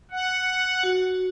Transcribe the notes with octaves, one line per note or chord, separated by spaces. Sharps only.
F#5
F#4